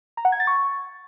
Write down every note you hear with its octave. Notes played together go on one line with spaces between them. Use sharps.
A#5
F#5
G#6
A6
C#6